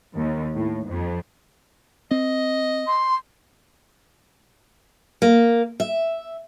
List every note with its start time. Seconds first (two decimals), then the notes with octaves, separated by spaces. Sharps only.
0.14 D#2
0.54 A2
0.85 F2
2.11 C4 D#5
2.86 C6
5.22 A#3
5.80 E5